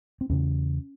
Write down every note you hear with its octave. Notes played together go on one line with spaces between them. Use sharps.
C4
E2 C#3 C#4